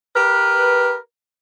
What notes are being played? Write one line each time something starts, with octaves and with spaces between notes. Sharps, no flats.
G4 A#4 B4